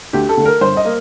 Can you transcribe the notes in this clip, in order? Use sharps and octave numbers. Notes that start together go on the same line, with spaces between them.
D2 G4
A4
D3 A3
A#4
G1 C5
D#5
A#3